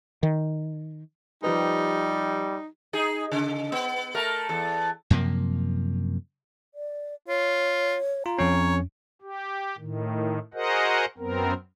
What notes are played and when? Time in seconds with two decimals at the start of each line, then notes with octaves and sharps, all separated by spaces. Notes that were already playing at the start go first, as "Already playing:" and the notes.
0.23 D#3
1.43 F3 G3 D#4 G4 B4
2.93 D#4 G#4
3.32 C#3
3.72 B3
4.14 A3 A#4
4.49 E2 A4
5.10 F#2 C3 F3 A#3
6.74 D5
7.28 F4 C#5
8.26 F4 A#5
8.39 F2 C#4 C#5
9.22 G4
9.78 A2 D#3
10.54 F#4 G#4 A#4 C5 D#5 F#5
11.18 F#2 B3 C4 A#4